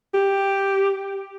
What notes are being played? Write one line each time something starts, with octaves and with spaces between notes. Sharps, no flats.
G4